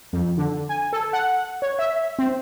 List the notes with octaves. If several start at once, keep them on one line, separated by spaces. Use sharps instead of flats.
F2
D3
G#5
A4
F#5
C#5
E5
C4